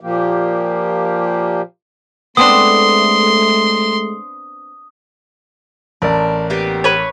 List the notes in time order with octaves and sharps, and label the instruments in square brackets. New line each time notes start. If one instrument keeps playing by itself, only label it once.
[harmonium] A#2 F3 A#3 G4
[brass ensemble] G#3 A3 [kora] B3 C4 D4 [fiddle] C6 [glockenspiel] D#6
[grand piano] A1 A#4 D5 [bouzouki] D4
[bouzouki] A#3 B3 G4
[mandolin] B4 C#5